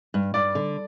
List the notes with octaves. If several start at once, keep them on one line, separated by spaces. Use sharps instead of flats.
G2
G2 D5
D3